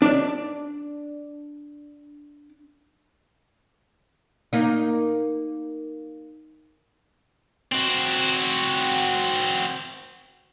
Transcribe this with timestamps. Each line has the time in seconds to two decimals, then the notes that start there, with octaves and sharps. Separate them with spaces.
0.02 D4 D5
4.53 A#3 D#4
7.72 C4 F#4